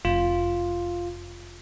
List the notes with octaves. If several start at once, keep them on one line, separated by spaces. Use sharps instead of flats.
F1 F4